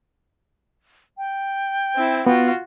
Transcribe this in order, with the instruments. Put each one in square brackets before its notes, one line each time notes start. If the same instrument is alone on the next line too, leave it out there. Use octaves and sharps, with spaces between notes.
[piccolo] G5
[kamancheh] C4 E4
[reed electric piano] B3 [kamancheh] F4 F#4